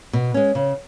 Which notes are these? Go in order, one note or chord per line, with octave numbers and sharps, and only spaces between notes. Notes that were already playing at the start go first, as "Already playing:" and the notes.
B2
G#3 C#4
C#3